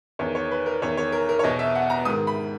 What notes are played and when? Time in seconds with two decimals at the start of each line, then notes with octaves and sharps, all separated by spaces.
0.19 E2 D#3 C#5
0.35 C#5
0.51 B4
0.66 A#4
0.82 E2 D#3 C#5
0.97 C#5
1.12 A#4
1.29 A#4
1.39 C#5
1.43 E2 B2 D#5
1.59 E5
1.75 F#5
1.90 A#5
2.05 G#2 D#3 D#6
2.27 B5